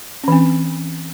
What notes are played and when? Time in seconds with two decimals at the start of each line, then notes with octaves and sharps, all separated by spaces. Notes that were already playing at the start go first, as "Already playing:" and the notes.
0.24 C#4
0.28 E3
0.32 C4